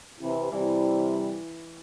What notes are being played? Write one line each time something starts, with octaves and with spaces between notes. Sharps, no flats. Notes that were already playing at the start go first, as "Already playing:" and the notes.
C3 E3
C3 E3 G3